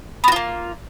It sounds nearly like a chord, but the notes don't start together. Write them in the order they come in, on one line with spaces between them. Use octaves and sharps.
B3 F#4 F4 A#3